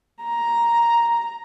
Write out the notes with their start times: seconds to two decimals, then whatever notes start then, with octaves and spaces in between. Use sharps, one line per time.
0.24 A#5